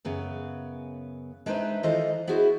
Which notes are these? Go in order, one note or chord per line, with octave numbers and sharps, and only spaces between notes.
F#2 C#3 B3
G#3 D4 D#4 B4 C5 E5
D#3 E3 F4 A4 C5 D#5
B3 E4 F#4 G#4 C5